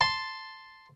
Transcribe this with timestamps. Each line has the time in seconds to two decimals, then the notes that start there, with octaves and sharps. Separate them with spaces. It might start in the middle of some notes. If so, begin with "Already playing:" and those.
0.01 A5 C6